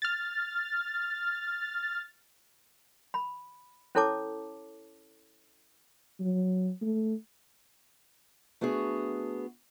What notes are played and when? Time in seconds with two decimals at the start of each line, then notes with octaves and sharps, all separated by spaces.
0.02 F6 A6
3.14 B5
3.95 C#4 E4 A4 C#5 A5 D6
6.20 F#3
6.82 A3
8.61 A3 B3 D4 F#4 G#4